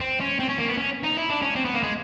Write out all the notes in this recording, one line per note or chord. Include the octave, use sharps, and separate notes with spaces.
C4
C#4
C4
C#4
A#3
B3
C#4
D#4
E4
D4
C#4
C4
B3
A#3
G#3